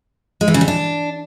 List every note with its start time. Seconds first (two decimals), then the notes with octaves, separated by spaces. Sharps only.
0.41 G#3
0.48 E3
0.54 C#3
0.61 G3
0.68 D4